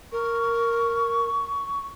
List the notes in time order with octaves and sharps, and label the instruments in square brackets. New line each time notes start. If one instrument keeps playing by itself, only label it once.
[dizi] A#4 [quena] C#6